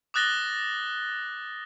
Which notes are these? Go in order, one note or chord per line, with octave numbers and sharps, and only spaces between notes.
D6 D#6 F#6 A6 A#6 G7